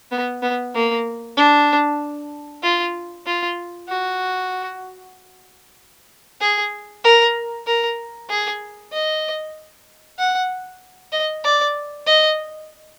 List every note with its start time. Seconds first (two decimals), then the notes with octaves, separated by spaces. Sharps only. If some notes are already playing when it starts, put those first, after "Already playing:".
0.11 B3
0.42 B3
0.75 A#3
1.37 D4
2.63 F4
3.26 F4
3.89 F#4
6.41 G#4
7.04 A#4
7.67 A#4
8.29 G#4
8.92 D#5
10.18 F#5
11.12 D#5
11.44 D5
12.07 D#5